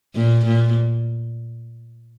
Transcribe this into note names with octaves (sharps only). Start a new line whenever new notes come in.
A#2
A#2